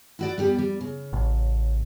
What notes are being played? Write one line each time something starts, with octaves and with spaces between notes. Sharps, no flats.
E4 F#4 D5
G3 B3 G4
G3
C#3
A1